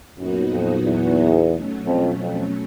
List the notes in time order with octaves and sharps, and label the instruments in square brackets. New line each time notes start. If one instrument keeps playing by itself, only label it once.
[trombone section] F#2 [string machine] A#2 F#3 B3 D#4 F#4
[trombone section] F2
E2
[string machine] B2 F#3 A3 C#4
[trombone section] F2
F2